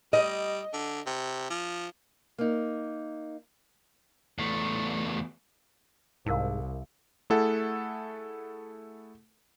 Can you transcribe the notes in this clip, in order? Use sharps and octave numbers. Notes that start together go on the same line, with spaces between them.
G3 D#5
D3
C3
F3
A#3 D#4
E2 A3
C2 G#2 E4 A#4 F5
A3 E4 G#4 A4 F#5